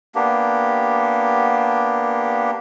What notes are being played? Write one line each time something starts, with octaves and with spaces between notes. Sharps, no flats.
A#3 B3 D4 G4